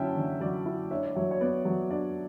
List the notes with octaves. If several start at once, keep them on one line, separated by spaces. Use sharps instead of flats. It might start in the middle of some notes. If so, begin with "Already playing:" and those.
Already playing: D3 F#3 C#4 E4 E5 G5 A5
D3
F#3 D5
E4
D4 C#5 E5
D5
F#3 C#5 E5
C#5
B3 D5
F#3
D4 D5